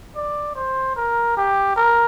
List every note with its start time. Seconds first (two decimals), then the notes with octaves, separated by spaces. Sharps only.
0.16 D5
0.55 C5
0.96 A#4
1.37 G4
1.76 A#4